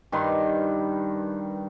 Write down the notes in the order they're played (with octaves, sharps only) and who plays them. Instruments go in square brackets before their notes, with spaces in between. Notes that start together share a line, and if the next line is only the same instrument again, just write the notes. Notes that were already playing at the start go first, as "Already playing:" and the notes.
[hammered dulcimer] G2 D#3 B4 C6